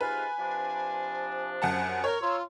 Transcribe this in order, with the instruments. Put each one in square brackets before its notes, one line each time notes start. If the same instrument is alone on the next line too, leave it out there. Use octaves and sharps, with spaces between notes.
[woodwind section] G#2 C3 F4 [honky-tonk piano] B4 [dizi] G#5
[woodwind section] C3 F3 D4
[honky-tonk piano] F#2 F#5 A5
[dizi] A#4 [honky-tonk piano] C#5
[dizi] F4 [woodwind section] A#5 C6 E6